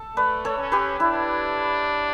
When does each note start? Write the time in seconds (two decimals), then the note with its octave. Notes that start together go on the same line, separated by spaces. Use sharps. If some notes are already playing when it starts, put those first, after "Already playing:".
Already playing: A4
0.16 A3 B4 D5
0.45 A4 C#5
0.58 C#4
0.72 G4 B4
1.00 D4 E4